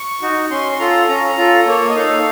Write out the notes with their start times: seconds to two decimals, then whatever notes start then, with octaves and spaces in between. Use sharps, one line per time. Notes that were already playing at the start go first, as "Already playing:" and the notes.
Already playing: C#6
0.22 D#4 F#4
0.51 C#4 C6
0.72 C6
0.79 F4 A4 A#5
1.08 C#4 A#5
1.37 F4 A4
1.66 A#3 C#5
1.89 D#5
1.95 D#4 A4 F5